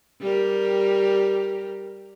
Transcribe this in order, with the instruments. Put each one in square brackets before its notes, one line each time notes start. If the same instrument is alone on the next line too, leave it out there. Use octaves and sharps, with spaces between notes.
[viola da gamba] G3 G4 A#4